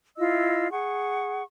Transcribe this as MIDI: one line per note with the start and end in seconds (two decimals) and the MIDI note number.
0.18 0.69 64
0.18 0.69 65
0.18 0.69 75
0.18 0.69 88
0.72 1.43 68
0.72 1.43 78
0.72 1.43 85